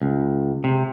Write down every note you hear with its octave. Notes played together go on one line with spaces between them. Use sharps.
C#2
C3